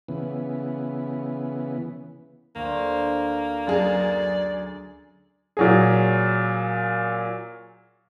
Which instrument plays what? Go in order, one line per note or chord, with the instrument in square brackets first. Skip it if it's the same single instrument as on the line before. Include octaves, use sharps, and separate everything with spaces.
[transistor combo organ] C#3 E3 B3
[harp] D2 [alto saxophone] A#3 [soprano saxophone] C5
[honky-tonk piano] F#2 G#4 [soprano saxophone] D5
[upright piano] A#2 F#3 G#4